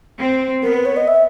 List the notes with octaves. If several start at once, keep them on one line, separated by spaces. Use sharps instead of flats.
C4
B3 A#4
B4
C#5
D#5
E5